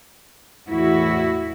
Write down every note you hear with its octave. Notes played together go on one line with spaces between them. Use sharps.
E2 A2 E4 F#4